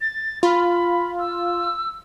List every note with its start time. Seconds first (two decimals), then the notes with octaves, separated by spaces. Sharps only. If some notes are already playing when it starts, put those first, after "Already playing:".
0.01 A6
0.43 F4 B5
1.19 E6